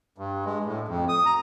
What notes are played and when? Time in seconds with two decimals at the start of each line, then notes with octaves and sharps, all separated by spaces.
0.18 G2
0.45 G#3
0.65 A2
0.88 F2
1.09 D#6
1.26 A#5